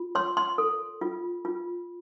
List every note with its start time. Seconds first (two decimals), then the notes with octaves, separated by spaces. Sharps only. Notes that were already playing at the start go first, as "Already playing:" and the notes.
Already playing: F4
0.15 C#5 C6
0.37 C6
0.58 A4
1.01 F4
1.45 F4